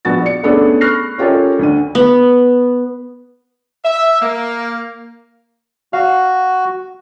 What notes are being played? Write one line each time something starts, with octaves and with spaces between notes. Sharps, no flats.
A#1 B3 F#4 A6
D5 C#7
A3 B3 C#4 D4 G#4 A4
B5 C#6 F6 F#6 A#6 C7
C#4 F4 G4 A4 A#4 C#5
D2 D3 D#7
B3
E5
A#3
F#4 F5